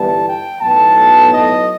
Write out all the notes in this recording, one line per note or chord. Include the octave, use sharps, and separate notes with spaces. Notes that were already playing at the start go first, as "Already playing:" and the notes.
Already playing: G1 G2 E3 G3 B3 A5
G5
B1 A2 F#3 B3 A5
D#5